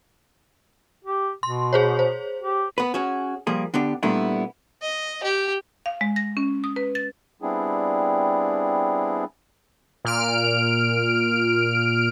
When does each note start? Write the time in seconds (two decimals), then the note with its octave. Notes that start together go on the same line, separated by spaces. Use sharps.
1.05 G4
1.43 B2 C6
1.73 G#4 C5 C#5
1.99 C5
2.40 G4
2.78 B3 B4
2.94 C#4 F#4 G#4
3.47 F3 G3 A#3 G#4
3.74 D3 B3 D4 G4
4.03 A#2 G3 A3 B3 D4 E4
4.82 D#5
5.23 G4
5.86 F5
6.01 G#3
6.16 A#6
6.37 C#4
6.64 D#6
6.76 B4
6.95 A6
7.42 G3 B3 C4 D4 E4 G#4
10.05 A#2 F6 D7